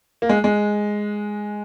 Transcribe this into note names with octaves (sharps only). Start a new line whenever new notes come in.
A#3
G#3
G#3